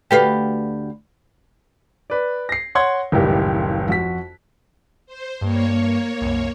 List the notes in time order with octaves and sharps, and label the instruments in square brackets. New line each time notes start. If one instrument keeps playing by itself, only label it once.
[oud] D2 B4 F5 [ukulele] F#4 G4 A4
[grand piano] B4 D5
A#6 C7
C#5 F#5 C6 G#6
F#1 C#2 A2 D#3 G3 G4
F2 F#4 B6
[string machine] C5
[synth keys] G2 [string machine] A#3 C#5
[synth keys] C2 F#2